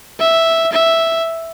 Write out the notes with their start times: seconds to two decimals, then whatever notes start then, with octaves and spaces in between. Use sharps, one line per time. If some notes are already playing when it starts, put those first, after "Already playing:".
0.19 E5
0.72 E5